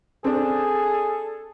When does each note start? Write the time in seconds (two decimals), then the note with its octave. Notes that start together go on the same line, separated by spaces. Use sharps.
0.24 C4 D4 G#4 A4